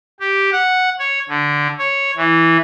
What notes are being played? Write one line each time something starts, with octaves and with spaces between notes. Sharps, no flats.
G4
F#5
C#5
D3
C#5
E3